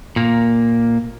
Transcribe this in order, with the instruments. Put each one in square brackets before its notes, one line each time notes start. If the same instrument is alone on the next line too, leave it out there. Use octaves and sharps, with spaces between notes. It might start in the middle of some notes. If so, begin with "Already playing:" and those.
[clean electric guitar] A#2 A#3